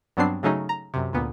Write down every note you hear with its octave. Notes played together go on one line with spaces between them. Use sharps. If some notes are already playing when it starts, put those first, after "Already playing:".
G2 F#3 B3 C4 D4 C7
C#3 F#3 A3 C#4 D#4 G#4
A#5
F#2 C3
D2 A#2 B3